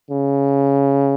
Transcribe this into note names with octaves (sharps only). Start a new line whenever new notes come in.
C#3